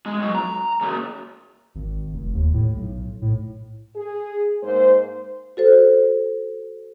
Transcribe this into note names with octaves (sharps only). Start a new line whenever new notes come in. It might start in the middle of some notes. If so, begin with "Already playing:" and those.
G#3
B1 F#3
A#5
C#3 A#3
G#1
F1
D#2
A2
B1
A2
G#4
G#2 A#3 C5
F#4 A4 C5